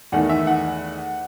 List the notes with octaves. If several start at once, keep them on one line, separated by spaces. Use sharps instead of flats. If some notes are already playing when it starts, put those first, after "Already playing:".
E2 D#3 A3 F#5
E5
F#5